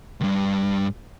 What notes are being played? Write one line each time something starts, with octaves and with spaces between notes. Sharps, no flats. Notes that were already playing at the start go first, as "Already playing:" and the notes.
C#2 G2